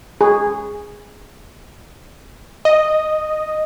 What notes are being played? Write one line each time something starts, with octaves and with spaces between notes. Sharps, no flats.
G#4
D#5